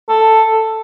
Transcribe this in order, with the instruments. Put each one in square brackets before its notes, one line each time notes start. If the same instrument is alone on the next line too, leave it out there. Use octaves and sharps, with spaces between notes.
[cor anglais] A4